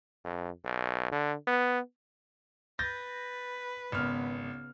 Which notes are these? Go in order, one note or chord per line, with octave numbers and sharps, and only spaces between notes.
F2
B1
D3
B3
B4 G6 A6 A#6
G#1 C#3 B3 F6